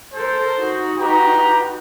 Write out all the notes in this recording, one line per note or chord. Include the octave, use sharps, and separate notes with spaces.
A4 A#4 C5
D#4 F#4
G4 B4 A#5